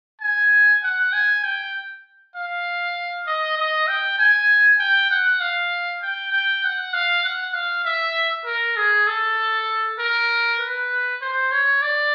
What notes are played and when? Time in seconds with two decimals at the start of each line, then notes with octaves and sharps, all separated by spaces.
0.21 G#5
0.83 F#5
1.13 G#5
1.44 G5
2.36 F5
3.27 D#5
3.57 D#5
3.87 G5
4.19 G#5
4.79 G5
5.10 F#5
5.41 F5
6.02 G5
6.32 G5
6.63 F#5
6.94 F5
7.24 F#5
7.54 F5
7.84 E5
8.46 A#4
8.77 G#4
9.07 A4
9.99 A#4
10.60 B4
11.22 C5
11.52 C#5
11.82 D5